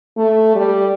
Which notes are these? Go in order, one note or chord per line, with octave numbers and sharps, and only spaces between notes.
A3
G3